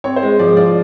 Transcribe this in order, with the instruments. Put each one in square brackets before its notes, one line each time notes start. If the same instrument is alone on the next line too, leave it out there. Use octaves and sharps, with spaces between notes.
[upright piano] C4 C#5
C5
G#3
F3 D5
F4 D5